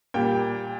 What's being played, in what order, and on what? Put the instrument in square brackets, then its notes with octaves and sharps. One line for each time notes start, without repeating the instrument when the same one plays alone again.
[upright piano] A#2 G3 G5